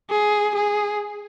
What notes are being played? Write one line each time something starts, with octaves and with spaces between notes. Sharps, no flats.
G#4
G#4